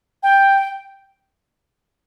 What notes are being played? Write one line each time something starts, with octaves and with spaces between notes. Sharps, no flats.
G5